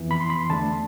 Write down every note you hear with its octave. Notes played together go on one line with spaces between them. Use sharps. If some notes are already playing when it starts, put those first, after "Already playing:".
Already playing: F2 E3 B3
B5
C6
B5
C6
E2 D3 A3 D4 A5